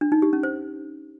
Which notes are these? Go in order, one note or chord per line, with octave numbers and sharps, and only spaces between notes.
D4
D#4
G4
C#4
C5